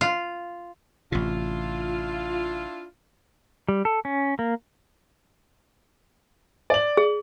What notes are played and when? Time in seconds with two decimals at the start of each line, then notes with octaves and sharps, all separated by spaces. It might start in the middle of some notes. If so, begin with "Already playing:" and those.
0.01 F4
1.12 A1 C3 D4 E4 F4
3.68 G3
3.85 A4
4.05 C#4
4.39 A#3
6.70 D5 F#7
6.97 G#4